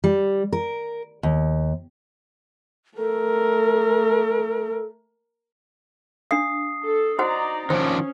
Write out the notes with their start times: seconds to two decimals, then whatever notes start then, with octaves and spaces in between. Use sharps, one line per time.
0.04 G3
0.53 A#4
1.23 D#2
2.97 A3 A4 A#4
6.31 D4 F5 D#6 C7
6.84 A4
7.19 D#4 F#4 C5 D5 F#5 A#5
7.70 D#3 F3 C#4 D4 C5